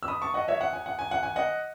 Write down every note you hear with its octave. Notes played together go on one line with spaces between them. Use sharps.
E6
B5 D#6
A5 C#6
D#5 F#5
C#5 E5
F#5
G#5
F#5
G#5
F#5
G#5
D#5 F#5